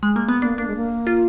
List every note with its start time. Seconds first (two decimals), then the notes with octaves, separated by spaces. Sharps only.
0.03 G#3
0.16 A#3
0.29 B3
0.42 A#3 D4
0.58 A#3 D4
0.67 G#3
0.76 A#3
1.07 F4